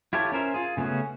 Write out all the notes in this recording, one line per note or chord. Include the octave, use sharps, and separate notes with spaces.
E4 F4 G4 A4 C#5
C#4 A#4 C5 E5
F4 G#4
C#3 A3 B3 C#4 F#4